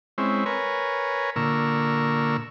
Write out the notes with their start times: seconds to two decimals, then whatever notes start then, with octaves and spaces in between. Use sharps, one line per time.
0.18 G#3 C4 C#4 E4
0.46 A#4 B4 C#5 G#5
1.36 A#2 D3 A#4 C#6 E6